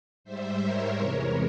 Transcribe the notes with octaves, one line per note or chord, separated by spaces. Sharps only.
G#2 G3 C5 E5
A#4 C#5
E2 C3 E3 G#3